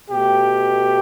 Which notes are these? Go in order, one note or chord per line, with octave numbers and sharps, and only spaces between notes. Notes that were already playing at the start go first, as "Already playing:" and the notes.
B2 A3 G4